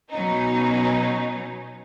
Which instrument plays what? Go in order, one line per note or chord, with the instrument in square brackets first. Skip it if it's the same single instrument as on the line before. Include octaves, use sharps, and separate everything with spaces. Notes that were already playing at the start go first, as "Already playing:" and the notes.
[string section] B2 F#3 C#4 D#4